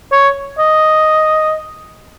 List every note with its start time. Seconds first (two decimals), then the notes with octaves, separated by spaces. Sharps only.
0.12 C#5
0.59 D#5